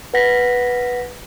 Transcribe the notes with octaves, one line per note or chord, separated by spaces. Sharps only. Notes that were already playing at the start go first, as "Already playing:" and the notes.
B4 F#5 A#6 B6